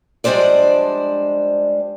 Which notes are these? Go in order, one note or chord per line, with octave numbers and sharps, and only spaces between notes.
F3 G3 G#3 D4 C5 D5